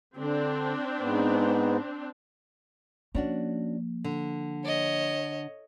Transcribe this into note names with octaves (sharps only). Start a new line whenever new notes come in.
D3 C4 D4
G#2 B3
F3 A#3 C#4 D4 F#4
D3
C#5 D#5